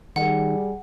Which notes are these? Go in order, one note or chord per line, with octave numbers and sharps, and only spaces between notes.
D#3 G3 G#4 F#5